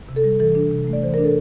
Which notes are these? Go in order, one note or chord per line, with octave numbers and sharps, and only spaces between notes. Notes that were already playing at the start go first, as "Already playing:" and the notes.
C3
A4
G3
E3 A4
D4
C3
A3
D5
E3 C5
D4 A#4
A4